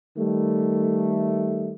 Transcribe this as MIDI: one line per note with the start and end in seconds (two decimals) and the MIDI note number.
0.17 1.74 51
0.17 1.74 55
0.17 1.74 57